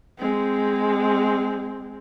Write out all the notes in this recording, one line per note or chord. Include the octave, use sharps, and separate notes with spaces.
G#3 C4